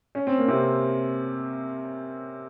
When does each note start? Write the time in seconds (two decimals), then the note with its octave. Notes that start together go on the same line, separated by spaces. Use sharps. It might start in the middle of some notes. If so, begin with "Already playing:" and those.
0.15 C#4
0.27 C4
0.38 A#3
0.48 C3 C4